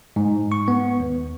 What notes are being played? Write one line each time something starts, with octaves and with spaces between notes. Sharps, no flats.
G#2
C#6
B3
D#2